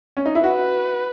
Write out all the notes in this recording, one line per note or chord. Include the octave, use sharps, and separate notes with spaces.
C#4
D#4
E4
F#4 B4